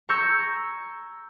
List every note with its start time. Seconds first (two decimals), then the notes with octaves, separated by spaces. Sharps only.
0.09 A#5 C#6 E6 G6 G#6 A#6